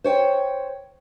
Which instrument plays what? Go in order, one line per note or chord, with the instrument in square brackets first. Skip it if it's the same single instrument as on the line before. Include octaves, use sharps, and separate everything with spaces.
[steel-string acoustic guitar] C5 C#5 G5